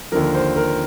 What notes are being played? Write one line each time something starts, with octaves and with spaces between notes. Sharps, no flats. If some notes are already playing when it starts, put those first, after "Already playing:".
D#2 D3 F3 A#4
C5
A#4